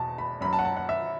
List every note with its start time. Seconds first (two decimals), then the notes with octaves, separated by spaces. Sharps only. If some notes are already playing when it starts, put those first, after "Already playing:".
Already playing: E2 B2 A5
0.18 B5
0.41 F#2 F#3 B5
0.53 A5
0.59 F#5
0.65 A5
0.77 F#5
0.89 E5